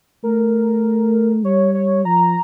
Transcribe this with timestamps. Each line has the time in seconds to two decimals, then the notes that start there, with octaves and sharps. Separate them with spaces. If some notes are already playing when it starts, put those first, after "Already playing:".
0.23 A3 A#4
1.44 G3 C#5
1.74 C#5
2.05 F3 A#5